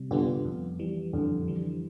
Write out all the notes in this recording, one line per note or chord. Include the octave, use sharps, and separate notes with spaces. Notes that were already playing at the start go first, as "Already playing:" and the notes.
Already playing: C3 G3
D3 G3 B3 F4
F2
E3 G3
F2 D3
E3 G3